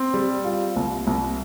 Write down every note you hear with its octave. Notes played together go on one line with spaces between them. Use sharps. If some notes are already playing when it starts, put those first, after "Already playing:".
Already playing: C4
G3
F4
C2
C2